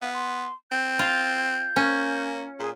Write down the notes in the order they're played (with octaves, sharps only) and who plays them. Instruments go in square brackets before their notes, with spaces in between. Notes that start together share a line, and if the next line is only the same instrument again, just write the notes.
[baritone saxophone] B3 [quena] F5
[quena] C6
[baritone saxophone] C4 [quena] G6
[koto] F4
[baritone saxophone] A#3 [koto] C#4
[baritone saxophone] A#2 [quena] G#4